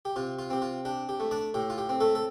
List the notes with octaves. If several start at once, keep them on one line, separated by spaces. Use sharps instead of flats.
G4
C3 F4
F4
C4 G4
F4
D4 G4
G4
A3
D4 D5
A2 G4
F4
G4
C4
A3 A4
A4